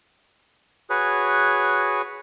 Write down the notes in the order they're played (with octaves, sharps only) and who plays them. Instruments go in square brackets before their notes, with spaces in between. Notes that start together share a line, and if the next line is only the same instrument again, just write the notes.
[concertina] F#4 G#4 B4 C#5